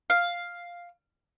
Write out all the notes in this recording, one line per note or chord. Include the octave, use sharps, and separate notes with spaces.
F5